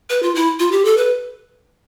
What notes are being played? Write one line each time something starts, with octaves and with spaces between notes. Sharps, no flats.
B4
F4
E4
F4
G4
A4
B4